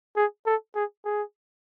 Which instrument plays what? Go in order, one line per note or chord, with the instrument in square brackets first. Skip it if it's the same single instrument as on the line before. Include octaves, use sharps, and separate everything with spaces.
[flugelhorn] G#4
A4
G#4
G#4